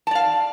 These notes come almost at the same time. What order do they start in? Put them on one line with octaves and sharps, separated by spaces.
A5 D5 F5